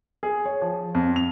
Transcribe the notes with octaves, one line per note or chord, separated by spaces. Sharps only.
G#4
C#5
F3
F2
F7